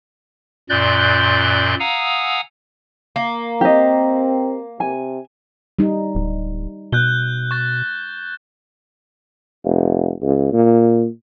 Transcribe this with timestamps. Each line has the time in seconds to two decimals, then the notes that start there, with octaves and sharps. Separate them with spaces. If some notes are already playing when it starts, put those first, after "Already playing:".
0.70 F#2 A#2 D5 C6 F#6 G6
1.80 F5 F#5 G#5 A#5 D#6 E6
3.16 A#3
3.61 C4 G4 D#5
4.80 C3 G#5
5.79 G3 D#4
6.15 D1
6.92 B2 F#6 G6 G7
7.51 C#6 A6
9.64 F1
10.22 C#2
10.52 A#2